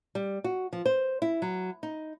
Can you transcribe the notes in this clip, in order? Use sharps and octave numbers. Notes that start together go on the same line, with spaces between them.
G3
F#4
F3
C5
E4
F#3
D#4